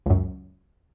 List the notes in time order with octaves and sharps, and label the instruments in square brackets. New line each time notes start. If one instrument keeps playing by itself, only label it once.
[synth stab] C#2 F#2